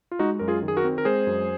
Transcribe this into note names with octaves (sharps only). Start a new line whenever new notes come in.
F4
G#3 D#4 F#4
F#2 A#4
F4 G#4
D#3
G#4
F#4 A#4
C4
A#4
G#3 G#4 C5
F#2